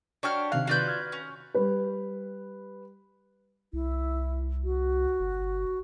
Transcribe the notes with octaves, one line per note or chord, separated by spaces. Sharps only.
D4 F#4 G4 C#5 F6
C3 D#3 F5 F#6
F4 F#4 B4 D5 G6
F6 G#6
C#4
G3 B4
C2 E4
F#4
G1